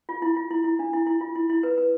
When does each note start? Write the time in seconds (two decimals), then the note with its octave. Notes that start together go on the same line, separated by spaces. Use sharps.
0.09 F4
0.22 E4
0.37 F4
0.50 E4
0.64 E4
0.79 D4
0.93 E4
1.07 E4
1.21 F4
1.35 E4
1.50 E4
1.63 B4
1.78 B4